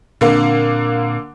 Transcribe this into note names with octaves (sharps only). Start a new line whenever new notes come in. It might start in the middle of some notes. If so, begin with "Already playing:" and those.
A#2 D3 A#3 C4